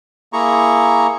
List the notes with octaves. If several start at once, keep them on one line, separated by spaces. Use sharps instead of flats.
A#3 E4 G#4 A#5 C#6